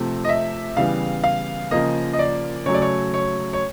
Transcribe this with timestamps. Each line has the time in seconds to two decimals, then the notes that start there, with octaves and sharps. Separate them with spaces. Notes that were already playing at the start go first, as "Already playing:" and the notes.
Already playing: C3 F3 A3 C4
0.24 D#5
0.29 E5
0.77 C#3 E3 G3 B3 F5
1.24 F5
1.71 C#3 F3 A#3 D#5
2.13 D#5
2.19 D5
2.66 C#3 F#3 A3 C#5
2.74 D5
2.82 C#5
3.14 C#5
3.53 C#5